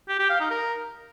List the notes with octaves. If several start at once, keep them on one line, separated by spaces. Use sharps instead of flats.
G4
G4
F5
D#4
A#4